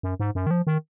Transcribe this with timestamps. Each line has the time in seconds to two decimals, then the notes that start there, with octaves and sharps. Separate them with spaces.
0.03 F#2
0.20 G#2
0.35 F#2
0.47 D#3
0.51 F3
0.67 D#3